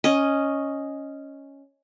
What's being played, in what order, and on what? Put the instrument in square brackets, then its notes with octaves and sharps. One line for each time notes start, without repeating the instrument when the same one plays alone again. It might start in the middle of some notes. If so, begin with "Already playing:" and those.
[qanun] C#4 D#5